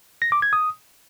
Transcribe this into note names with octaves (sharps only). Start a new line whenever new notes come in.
A#6
D6
G#6
D#6